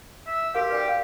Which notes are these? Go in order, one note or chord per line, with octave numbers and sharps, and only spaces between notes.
E5
F#4 G4 A#4 F5
B4 D5 G5
F5